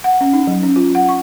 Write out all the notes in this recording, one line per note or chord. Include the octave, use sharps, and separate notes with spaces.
F#5
C#4
D#4
F#3
C#4
F4
F#5
C#6